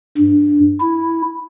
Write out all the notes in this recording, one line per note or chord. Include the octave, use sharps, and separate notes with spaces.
G2
E4